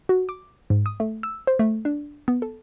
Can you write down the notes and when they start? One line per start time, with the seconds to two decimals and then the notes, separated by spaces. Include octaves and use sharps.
0.09 F#4
0.29 D6
0.70 G#2
0.86 D#6
1.00 A3
1.23 E6
1.47 C5
1.59 A3
1.85 D4
2.28 B3
2.42 A4